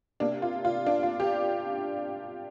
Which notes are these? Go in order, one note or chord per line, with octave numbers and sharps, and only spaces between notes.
C3 A#3 D4
F4
F4
D4
F4
G4